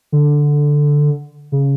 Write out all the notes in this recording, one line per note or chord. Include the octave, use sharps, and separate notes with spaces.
D3
C#3